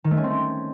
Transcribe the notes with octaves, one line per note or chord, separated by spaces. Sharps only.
D#3
A3
C#4
C4
C#4